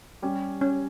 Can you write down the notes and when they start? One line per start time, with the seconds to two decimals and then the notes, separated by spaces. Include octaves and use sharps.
0.22 G3 C#4 G4
0.61 C#4